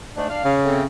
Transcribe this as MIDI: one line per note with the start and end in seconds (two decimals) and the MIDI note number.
0.16 0.25 44
0.16 0.25 57
0.16 0.29 62
0.30 0.41 62
0.30 0.54 77
0.45 0.85 49
0.45 0.80 73
0.64 0.82 57
0.64 0.82 60